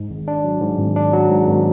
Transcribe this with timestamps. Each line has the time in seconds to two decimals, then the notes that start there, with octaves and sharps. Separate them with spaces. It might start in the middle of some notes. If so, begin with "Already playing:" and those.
Already playing: G#2
0.10 G#1
0.28 D4
0.44 F#3
0.61 G#2
0.78 G#1
0.96 D4
1.13 F#3
1.30 G#2
1.47 G#1